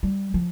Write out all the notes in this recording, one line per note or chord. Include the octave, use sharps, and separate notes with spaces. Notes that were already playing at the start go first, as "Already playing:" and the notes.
G3
F3